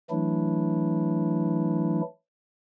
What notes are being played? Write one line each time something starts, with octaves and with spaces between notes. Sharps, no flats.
E3 F#3 A3 D4 E4